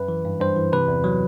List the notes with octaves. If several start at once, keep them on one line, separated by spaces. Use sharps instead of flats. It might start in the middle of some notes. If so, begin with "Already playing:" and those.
Already playing: F#2 B4
E3
G2
G2 C5
E3
C3 B4
E2
F#3